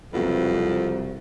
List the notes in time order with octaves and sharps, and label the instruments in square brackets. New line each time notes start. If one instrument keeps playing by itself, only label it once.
[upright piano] F#1 F#4 B4 [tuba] C2 [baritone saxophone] F2